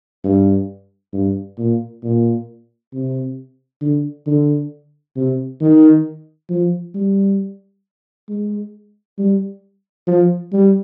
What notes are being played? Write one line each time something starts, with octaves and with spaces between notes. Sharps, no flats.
G2
G2
A#2
A#2
C3
D3
D3
C3
D#3
F3
G3
G#3
G3
F3
G3